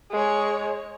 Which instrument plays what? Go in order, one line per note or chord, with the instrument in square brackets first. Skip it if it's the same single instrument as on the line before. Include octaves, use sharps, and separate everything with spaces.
[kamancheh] G#3 C#5